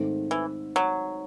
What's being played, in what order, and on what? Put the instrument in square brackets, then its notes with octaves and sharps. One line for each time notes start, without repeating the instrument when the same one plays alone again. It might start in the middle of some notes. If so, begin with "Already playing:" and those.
Already playing: [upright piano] G#2 D#3 A3 C4
[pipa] E3
F#3